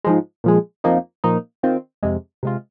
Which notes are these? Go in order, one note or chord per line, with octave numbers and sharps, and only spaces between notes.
G#2 F3 G#3
A#2 F3 G#3
F2 F3 A#3 D#4
A#2 F3 A#3 D#4
D#3 C4 F4
F2 C3 G#3
C3 G#3 F4